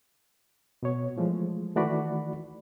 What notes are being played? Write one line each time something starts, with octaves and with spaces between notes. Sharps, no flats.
B2 B3 C#5
E3 F3 G#3 A3
D#3 E3 A3 F#4 D5 B5